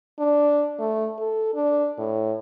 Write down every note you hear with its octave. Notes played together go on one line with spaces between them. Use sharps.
D4
A3
A4
D4
A2